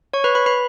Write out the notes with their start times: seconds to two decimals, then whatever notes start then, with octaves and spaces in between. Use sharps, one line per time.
0.13 C#5 C#6
0.24 B4 B5
0.35 B4 B5
0.46 B4 B5